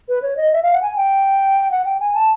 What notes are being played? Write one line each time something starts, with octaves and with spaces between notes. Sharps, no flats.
B4
C#5
D#5
E5
F5
F#5
G#5
G5
F#5
G5
G#5
A5